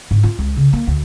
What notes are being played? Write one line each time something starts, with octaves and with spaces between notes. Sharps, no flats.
G#2
F4
C#2
C#3
A#3
D2